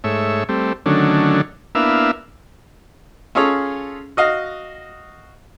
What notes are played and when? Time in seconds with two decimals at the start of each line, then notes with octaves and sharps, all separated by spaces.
0.04 G#2 A3 C#5 E5
0.49 G3 A3 C4
0.86 D3 D#3 F#3 A3 C#4 D4
1.75 A#3 B3 D4 E4 E5 F5
3.35 C#4 F4 G#4 A4 C#5
4.17 F#4 D#5 F5